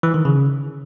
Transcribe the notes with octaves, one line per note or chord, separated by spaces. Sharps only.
E3
D#3
C#3